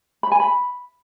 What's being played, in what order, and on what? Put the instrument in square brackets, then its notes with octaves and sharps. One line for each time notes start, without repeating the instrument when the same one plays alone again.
[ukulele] B5
G#5
B5